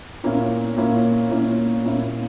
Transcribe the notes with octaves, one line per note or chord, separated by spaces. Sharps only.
A#2 A#3 C#4 E4
A#2 A#3 C#4 E4
A#2 A#3 C#4 E4
A#2 A#3 C#4 E4